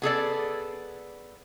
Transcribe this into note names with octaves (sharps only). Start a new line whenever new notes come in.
B3 G#4 A4 D5